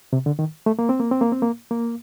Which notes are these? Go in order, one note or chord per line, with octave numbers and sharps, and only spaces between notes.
C3
D3
D#3
A3
A#3
C4
A#3
C4
A#3
C4
A#3
A#3